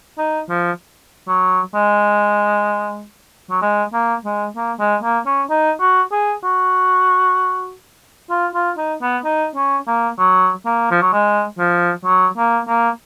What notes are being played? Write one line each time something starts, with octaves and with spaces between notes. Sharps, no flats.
D#4
F3
F#3
G#3
F#3
G#3
A#3
G#3
A#3
G#3
A#3
C#4
D#4
F#4
G#4
F#4
F4
F4
D#4
B3
D#4
C#4
A#3
F#3
A#3
F3
F#3
G#3
F3
F#3
A#3
A#3